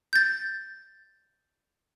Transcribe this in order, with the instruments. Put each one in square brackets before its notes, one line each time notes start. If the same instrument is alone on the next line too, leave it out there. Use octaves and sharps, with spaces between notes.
[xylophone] G6 A6